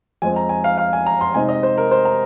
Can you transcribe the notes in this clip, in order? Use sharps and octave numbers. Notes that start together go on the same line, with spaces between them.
F2 F3 G#3 C4 G#5
A#5
G#5
F5
F5
G#5
A#5
C6
C3 G#3 C4 D#4 G#5
D#5
C5
A#4
C5
A#5